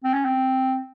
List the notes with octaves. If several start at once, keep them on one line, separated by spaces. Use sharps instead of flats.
C4
C#4
C4